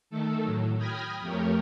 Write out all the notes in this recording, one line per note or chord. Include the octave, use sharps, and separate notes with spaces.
D#3 A3 A4
A2 F#3
G5 B5 D#6 F6 G#6 A#6
F2 A3 G4 A#4 C#5